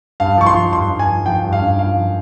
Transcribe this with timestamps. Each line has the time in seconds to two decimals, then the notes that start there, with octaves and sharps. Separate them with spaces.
0.20 G2 F5
0.38 F3 C#6
0.46 C6
0.55 F3
0.73 G2 C6
0.91 G2
0.99 G#5
1.08 F3
1.26 F3 G5
1.44 G2
1.53 F5
1.62 G2
1.79 F3 F5
1.97 F3